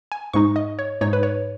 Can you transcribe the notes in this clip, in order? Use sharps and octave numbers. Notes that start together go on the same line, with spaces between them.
G#5
G#2 G#3 D#4 C#6
D#5
C#5
G#2 G#3 D#4 C#5
B4
C#5